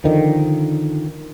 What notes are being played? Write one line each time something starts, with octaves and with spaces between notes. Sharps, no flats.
D3 D#3 F3